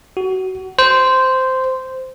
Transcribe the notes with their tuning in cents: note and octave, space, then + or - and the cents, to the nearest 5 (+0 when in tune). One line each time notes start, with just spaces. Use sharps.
F#4 +20
C5 -10